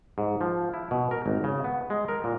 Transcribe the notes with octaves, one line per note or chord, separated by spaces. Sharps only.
G#2
F3
E4
B2
A#4
G#1
C#3
B3
G#3
A#4
A#2